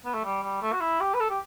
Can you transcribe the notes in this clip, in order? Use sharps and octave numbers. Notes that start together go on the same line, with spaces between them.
B3
A3
G3
G3
A3
F#4
E4
G4
B4
A4
G4